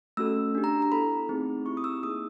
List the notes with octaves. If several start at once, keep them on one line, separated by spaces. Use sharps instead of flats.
A3 C#4 F#4 A4 E6
D4 G4
A#5
A#5
B3 E4 A4 B5
A3 C4 D#4 G#4
C4 E4 G4 C#6
D#6
E6
A#3 D#4 G#4 D#6